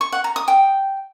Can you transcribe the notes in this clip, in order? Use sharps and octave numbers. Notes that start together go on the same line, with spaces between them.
C#6
F#5
A#5
D#6
G5